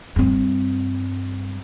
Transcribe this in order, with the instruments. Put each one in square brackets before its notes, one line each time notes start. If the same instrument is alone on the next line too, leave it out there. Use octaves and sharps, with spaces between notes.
[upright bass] G2 C4